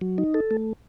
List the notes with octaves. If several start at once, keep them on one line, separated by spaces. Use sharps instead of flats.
F#3
D#4
A4
A3